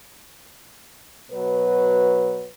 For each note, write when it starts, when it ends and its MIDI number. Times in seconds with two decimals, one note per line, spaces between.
1.31 2.47 47
1.31 2.47 54
1.31 2.47 71